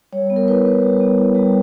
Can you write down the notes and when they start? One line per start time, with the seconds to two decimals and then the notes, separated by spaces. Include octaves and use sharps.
0.13 G3 C#5
0.30 B3
0.36 A#4
0.48 E4 B4
0.65 G3
0.83 G3
1.01 B3
1.18 E4
1.35 G3